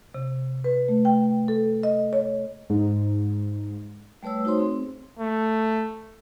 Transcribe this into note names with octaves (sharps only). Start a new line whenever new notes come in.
C3
B4
A3
G5
A4
D#5
C#5
G#2
G3 A3 B4 C#5 E6
A3 D#4 F#4 C5 C#5 C6
C4 G#4
A3